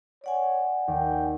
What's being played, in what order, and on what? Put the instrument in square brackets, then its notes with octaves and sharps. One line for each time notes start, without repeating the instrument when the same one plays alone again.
[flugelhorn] C#5 [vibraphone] D5 F#5 G#5
[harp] D#2 [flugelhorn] G5